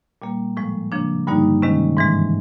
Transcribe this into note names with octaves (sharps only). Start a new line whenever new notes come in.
A#2 G3 A#3
A2 F3 G#3
C#3 F3 A#3 D4
G2 D3 G3 A#3 D#4
C3 D#3 G#3 C#4
G#2 E3 G#3